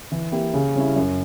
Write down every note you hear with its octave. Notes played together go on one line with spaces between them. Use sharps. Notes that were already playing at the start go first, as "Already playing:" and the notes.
E3
A#3 E4 G4
C#3
G3 C#4 E4
F#2